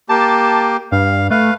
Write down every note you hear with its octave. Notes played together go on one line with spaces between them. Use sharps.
A#3 G4 A5
G2 F5
A3 B4 F5